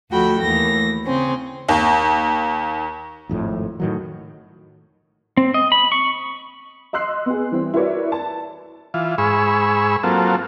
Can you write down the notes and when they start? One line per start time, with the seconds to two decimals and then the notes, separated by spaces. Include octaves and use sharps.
0.10 D2 F3 F#4 A4 G5 B5
0.40 D#2 E3 A3 A#6
1.04 C#3 C4 C#4
1.68 D#2
3.29 G#1 F2 A2
3.80 A2 D#3 F#3
5.37 C4
5.54 D#5
5.72 B5
5.92 C#6
6.93 D#5 C6 E6 F#6 C7
7.26 B3 G#4
7.52 E3 G3 C4 E4
7.74 E4 F#4 A#4 B4 C#5 D5
8.12 A5
8.94 E3 F4
9.18 G#2 G#4 B5 C#6 E6
10.03 F#3 A#3 C4 F4 A4